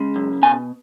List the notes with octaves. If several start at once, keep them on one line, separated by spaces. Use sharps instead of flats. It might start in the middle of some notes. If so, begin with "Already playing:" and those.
Already playing: C#3 G#3
F#2
B2 G#5